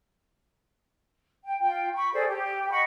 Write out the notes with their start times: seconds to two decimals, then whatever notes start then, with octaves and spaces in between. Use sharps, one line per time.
1.44 G5
1.61 F4 G5
1.94 B5 C#6
2.13 G#4 A4 C5 D5
2.27 G4 G5
2.70 D#5 F#5 B5 C#6